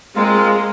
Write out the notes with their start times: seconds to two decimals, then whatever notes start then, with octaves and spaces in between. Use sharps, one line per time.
0.16 G#3 C4 F4 A#4 F5